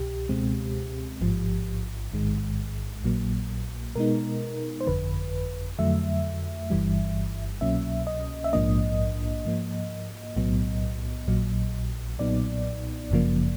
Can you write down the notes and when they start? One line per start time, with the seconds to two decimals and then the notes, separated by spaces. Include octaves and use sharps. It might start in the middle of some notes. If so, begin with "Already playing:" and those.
Already playing: C2 B2 G4
0.29 C#2 B2 G#3 C4
1.21 A1 G#2 F3
2.12 A1 G#2 D#3 G#3
3.04 A#1 A#2 F#3 A#3
3.96 B2 G#3 B3 D#4 A#4
4.81 C5
4.87 G1 F2 D3 B4
5.79 F2 D3 F#3 A3 E5
6.70 G1 G2 E3 G3
7.61 C2 B2 F#3 A#3 C#4 E5
8.07 D#5
8.44 E5
8.53 A#1 G#2 F3 A#3 D4 D#5
9.45 G#2 F3 A#3
10.36 B1 A2 F#3 B3
11.28 A#1 A#2 F#3
12.19 B1 A#2 F#3 B3 D#4 D5
13.10 G1 F#2 C#3 F3 A#3